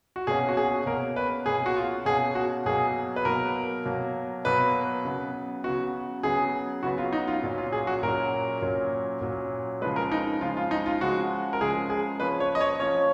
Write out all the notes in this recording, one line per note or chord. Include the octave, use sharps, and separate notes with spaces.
F#4
B2 A#3 C#4 G#4
F#4
G#4
B2 A#3 C#4 A#4
B4
B2 A#3 C#4 G#4
F#4
F4
B2 A#3 C#4 G#4
F#4
B2 F#3 A#3 G#4
B4
B2 F#3 A#3 A#4
B2 F#3 A#3
B2 F#3 A#3 B4
C#3 F#3 B3
C#3 F#3 B3 F#4
C#3 F#3 B3 G#4
C#3 F#3 B3 F#4
F4
D#4
F4
A#2 F#3 C#4
F4
G#4
F#4
A#2 F#3 C#4 A#4
A#2 F#3 C#4
A#2 F#3 C#4
C#3 F3 G#3 B4
A#4
D#4
C#3 F3 G#3 F4
F4
D#4
F4
C#3 F3 G#3 F#4
A#4
C#3 F3 G#3 G#4
G#4
F3 A#3 C#4 B4
C#5
D#5
C#5
F3 A#3 C#4 C#5